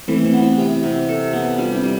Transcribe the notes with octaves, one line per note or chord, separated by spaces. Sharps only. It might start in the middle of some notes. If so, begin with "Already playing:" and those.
E3 A3 C4
A3 C4
B3
C4 E4
C3 E4 G4
C3
A4
B3
G3 D4 F4
C4 E4
G3